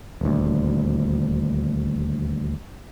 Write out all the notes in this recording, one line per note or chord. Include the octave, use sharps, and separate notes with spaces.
D#1 D2